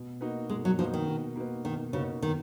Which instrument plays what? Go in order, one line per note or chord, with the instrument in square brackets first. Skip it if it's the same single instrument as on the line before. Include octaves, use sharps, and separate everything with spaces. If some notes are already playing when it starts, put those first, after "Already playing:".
Already playing: [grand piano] B2
A#3 D#4 F#4 B4
[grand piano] B2 [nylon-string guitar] G#3
[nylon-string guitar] F#3
[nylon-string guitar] F3 [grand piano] A#3 D#4 F#4 B4
[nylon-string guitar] D#3
[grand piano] B2
A#3 D#4 F#4 B4
[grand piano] B2 [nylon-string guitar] D#3
[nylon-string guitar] C#3 [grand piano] A#3 D#4 F#4 B4
[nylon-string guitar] D#3 [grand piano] B3